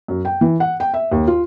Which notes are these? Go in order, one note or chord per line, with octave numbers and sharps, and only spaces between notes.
F#2
G5
E3
F#5
G5
E5
D#2
F4